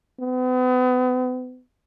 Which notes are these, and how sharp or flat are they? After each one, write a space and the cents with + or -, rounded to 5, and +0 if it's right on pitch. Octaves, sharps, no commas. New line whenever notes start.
B3 +40